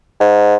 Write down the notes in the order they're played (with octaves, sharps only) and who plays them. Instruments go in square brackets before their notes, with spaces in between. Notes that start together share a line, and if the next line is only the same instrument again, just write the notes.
[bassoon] G#2